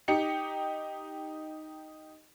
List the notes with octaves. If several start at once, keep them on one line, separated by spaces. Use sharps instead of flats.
D#4 G4 C#7